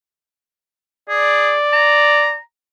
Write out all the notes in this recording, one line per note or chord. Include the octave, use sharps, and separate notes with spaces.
G#4 D5
A#5